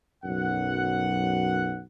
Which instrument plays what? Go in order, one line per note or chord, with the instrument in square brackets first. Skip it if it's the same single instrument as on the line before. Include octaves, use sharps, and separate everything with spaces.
[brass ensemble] B1 F#2 F#5